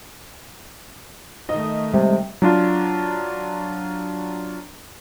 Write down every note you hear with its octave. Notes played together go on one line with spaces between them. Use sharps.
D#3 A3 D#5
C3 G3 G#3
F#3 D4 F4